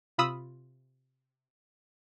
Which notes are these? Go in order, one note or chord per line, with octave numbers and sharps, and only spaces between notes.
C3 F4 B5 D#6 E6